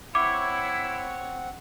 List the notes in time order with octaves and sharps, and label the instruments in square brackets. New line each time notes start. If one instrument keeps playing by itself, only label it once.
[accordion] C4 F#5 [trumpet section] E4 [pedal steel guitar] C#5 [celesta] D6